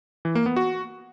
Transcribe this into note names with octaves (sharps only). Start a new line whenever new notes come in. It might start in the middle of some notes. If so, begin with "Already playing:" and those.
E3
A#3
B3
F#4